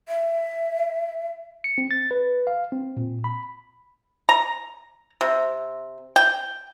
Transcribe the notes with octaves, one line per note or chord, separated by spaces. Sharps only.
E5
C#7
C4
A6
B4
F5
C4
A#2
B5
A#5
C3
G5